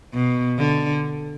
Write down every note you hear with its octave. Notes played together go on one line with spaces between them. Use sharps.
B2
D3